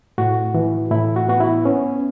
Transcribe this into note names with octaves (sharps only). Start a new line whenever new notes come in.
A2 F#4
E3
A2 E4
F#4
B3 F#4
E4
B3 C#4